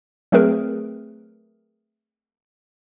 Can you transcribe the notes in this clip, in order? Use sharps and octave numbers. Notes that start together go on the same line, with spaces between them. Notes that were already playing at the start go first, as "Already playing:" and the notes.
F#3 A3 C4 G#4 A#4 B4